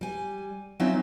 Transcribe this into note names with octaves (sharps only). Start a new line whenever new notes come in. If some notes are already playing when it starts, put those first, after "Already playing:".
G3 G#5
F#3 C4 C#4 D#4 F4 E5